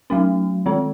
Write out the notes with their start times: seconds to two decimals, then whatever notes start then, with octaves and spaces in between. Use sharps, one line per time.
0.10 F#3 A3 C#4
0.66 D#3 G#3 C4